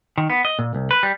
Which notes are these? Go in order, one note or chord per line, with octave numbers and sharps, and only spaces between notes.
D#3
B3
D#5
A#2
C2
B4
G3